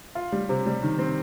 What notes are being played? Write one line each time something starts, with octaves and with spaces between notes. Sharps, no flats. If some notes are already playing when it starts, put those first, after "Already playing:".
F4
G3
C3
G3
D#3
C4